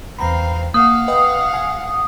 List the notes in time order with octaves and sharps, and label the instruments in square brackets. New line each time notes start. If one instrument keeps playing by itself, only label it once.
[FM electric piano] E2 A#5 B5 [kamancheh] C4 F5
[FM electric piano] A#3 [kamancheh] F5 F#5 [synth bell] D#6
[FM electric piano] B4 D#5 G5
G#5